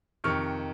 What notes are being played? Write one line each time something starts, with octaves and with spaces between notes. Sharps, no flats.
F2 C3 D#3 C#6 F6